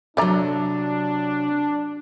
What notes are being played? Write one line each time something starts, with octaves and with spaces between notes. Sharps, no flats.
C3 F#3 A3 D4 D5 A#5